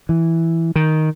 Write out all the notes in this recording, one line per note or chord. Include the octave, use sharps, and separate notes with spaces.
E3
D#3